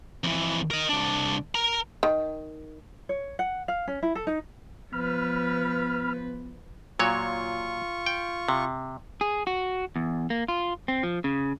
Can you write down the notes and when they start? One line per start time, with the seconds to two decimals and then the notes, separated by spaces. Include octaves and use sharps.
0.24 F2 E3
0.71 A#4 D#5
0.89 C2 D4
1.55 A#4 A#5
2.03 D#3
3.09 C#5
3.39 F#5
3.68 F5
3.88 C#4
4.03 E4
4.15 A4
4.27 D#4
4.93 F3 B3 B4 B5 F6
6.99 A#2 F#3 F4 C#5 C#6
8.06 G5
8.49 C3
9.21 G#4
9.47 F#4
9.96 E2
10.30 A#3
10.48 F4
10.88 C4
11.03 F3
11.24 C#3